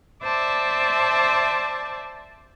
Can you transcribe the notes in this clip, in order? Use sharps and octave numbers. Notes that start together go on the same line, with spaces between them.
C5 D5 E5 A5